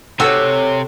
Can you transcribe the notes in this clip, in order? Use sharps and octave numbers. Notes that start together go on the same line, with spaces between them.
C3 F#4 A4 C#5 F#5 E6